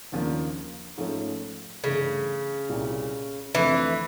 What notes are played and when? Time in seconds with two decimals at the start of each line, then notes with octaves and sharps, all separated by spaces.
0.12 D#2 C#3 F3 A#3 D4
0.97 G#2 F3 A3 C#4
1.84 G2 C#3 E3 A3
2.69 C2 A#2 G3 A#3
3.55 F2 D3 E3 F3 A3 C4